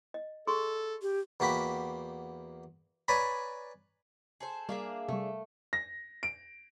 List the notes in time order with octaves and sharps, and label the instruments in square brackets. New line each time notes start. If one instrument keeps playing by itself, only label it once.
[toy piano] D#5
[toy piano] G#4 C6 C#6 [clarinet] A4
[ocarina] G4
[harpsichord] E2 A#3 F#4 G4 B5
B4 C#5 D5 G#5 A#5 B5
[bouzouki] G#4 A4 C5
[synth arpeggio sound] G3 [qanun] A#3 [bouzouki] D4 G#4 E5
[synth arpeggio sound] C3 G3 [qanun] A3
[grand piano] A#6
D7